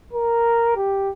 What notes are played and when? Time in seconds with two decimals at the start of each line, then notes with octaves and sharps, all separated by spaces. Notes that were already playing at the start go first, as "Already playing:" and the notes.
0.13 A#4
0.76 G4